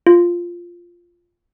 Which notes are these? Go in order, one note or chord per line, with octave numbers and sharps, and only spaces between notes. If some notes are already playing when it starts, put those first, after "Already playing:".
F4